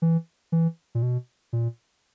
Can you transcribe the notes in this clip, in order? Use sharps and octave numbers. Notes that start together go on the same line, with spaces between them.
E3
E3
A#2
B2
A#2